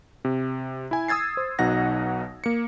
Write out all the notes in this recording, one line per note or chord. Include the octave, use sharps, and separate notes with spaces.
C3
E4 G#5
D#6 E6 G#6 A6 C7
C5
B1 B2 D#4 F#5 A#6
A#3 C#7